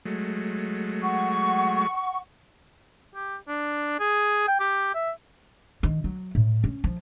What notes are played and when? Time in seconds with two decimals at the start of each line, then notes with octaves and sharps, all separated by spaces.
0.05 F#3 G#3 A3
1.02 F#5 C#6
3.15 G4
3.48 D4
4.00 G#4
4.48 G5
4.60 G4
4.95 E5
5.83 D#3
6.04 F#3
6.35 A2
6.64 C#4
6.84 F3